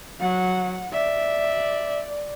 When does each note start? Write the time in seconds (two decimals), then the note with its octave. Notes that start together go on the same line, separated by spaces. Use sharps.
0.20 F#3 F#5
0.93 D5 E5